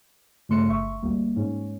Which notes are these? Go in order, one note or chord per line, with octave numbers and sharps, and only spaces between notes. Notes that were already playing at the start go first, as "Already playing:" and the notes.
G2 C#3 A3 C6 C#7
G1 E5 C#6
D2 G3 A#3
G#2 C#4